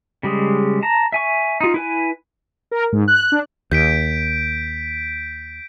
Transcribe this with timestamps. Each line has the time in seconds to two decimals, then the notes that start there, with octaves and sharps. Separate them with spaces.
0.23 C#3 G3 G#3
0.83 A5 A#5
1.12 E5 G#5 C#6
1.61 D#4 F4
1.74 E4 B4 G#5
2.71 A#4
2.93 G#2
3.08 F#6
3.32 D4
3.71 D#2 G6 B6 D7